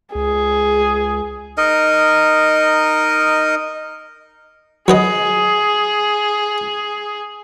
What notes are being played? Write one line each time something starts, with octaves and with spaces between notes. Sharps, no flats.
C#2 G#4
D#4 A#4 D#5
F#3 G#4 B4 D#5